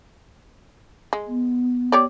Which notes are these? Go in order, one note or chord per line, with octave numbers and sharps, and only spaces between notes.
G#3
B3
G4 C#5 D5